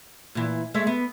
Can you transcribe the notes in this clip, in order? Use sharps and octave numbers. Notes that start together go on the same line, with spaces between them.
A#2 E3
G#3 A3 E5
B3